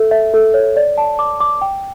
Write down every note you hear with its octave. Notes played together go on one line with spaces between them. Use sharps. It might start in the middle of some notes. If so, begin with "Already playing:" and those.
Already playing: A4 E5
E5
A4
C#5
D5
A5
D6
D6
G5